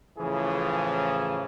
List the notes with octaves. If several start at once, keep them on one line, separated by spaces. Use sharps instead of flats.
A2 C#3 E3 F3 G#4